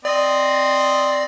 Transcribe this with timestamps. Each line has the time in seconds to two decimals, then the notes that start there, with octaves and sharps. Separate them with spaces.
0.05 C4 D5 D#5